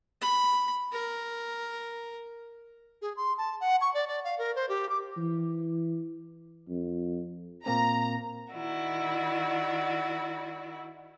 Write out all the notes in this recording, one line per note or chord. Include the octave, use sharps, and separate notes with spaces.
B5
A#4
G#4
C6
A5
F#5
C#6
D5
D5
F5
A#4
C5
G4
D6
E3
F2
A#2 A#3 C4 A#5
D#3 E4 F#4 D5